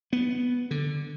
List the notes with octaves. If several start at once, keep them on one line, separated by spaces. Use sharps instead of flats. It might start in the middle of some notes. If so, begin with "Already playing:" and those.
B3
D3